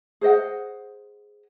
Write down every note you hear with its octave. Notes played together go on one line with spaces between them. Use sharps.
G#4 C5 D#5 F#5